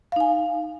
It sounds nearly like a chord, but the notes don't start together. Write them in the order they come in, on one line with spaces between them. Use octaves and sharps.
F5 D#4 G#5